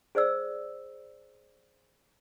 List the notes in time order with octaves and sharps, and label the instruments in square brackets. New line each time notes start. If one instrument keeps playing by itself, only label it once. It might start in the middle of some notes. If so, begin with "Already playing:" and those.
[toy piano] G#4 C5 D5 E6